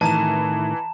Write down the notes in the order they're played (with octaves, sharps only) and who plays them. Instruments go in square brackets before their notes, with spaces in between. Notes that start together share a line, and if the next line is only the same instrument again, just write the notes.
[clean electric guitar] A2 D#3 [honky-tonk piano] E3 [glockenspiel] A5 A#5 E7